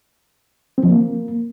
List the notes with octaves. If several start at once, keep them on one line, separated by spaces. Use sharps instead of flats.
C4
F3
A#3